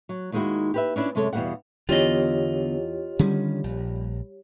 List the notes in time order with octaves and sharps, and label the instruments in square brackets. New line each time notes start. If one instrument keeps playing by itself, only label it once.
[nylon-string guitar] F#3
D#2 D#3 G#3 D#4 E4 F#4
G4 B4 E5
C#4 D4 E4 D5
F#2 C3 G#3 A4 C#5
E2 B2 G3 A#3 F5 F#5
[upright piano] E2 [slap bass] D3 B3 [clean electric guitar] F4 D#5 [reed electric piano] G4 C#5
[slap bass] D3 D#3 C#4 [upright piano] G3
[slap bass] A#1